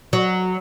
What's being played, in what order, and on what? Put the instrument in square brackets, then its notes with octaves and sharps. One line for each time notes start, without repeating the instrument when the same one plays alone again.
[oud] F#3